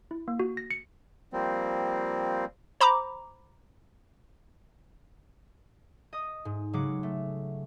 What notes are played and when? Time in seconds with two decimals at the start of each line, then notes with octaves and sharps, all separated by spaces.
0.11 E4
0.28 A#3
0.39 F#4
0.57 A#6
0.71 C#7
1.33 F3 G3 A#3 C4
2.81 C5 A#5 B5 D6
6.13 D#5 D#6
6.45 G#2
6.73 C#3 F#3 G#3 F#5 D6 C#7
7.03 A3